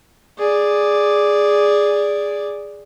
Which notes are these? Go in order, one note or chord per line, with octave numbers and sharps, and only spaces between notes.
G#4 D5